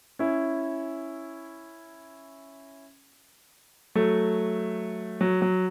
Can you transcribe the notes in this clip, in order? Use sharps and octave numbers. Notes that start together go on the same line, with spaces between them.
C#4 E4
F#3 A3
F#3
F#3